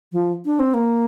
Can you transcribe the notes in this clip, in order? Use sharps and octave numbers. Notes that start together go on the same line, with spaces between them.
F3
D4
C4
A#3